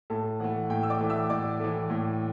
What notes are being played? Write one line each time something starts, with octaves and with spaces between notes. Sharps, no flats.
A2 A4 A5
E3 A3 F#5
A2 G5
E6
D5 D6
E3 A3
E5 E6
A2 D5 D6
E3 A3
A2